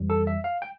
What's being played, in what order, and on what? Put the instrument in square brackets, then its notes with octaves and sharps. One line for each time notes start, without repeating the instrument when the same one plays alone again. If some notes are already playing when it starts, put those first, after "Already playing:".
Already playing: [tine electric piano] F2 E3 G3
A4
E5
F5
G5